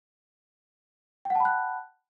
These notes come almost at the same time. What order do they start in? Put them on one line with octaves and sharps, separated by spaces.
G5 F#5 A5 B5 F#6